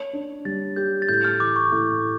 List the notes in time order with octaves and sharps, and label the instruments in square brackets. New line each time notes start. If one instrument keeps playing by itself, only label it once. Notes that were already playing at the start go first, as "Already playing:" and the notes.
Already playing: [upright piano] C#5
D4
[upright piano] G3 [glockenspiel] A6
[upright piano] G4 [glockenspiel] G6
[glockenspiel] A6
[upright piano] A2 [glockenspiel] G6
[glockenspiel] F6
[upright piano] E3 [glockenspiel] D6
[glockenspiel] C#6
[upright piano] A2